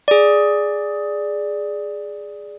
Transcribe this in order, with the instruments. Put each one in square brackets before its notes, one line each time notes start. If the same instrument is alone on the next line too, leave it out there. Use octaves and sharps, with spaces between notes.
[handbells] G#4 D5